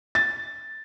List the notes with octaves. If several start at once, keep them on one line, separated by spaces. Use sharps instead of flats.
A6